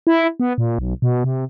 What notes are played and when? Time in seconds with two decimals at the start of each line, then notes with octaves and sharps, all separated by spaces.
0.07 E4
0.40 B3
0.58 A#2
0.79 B1
1.02 B2
1.24 C3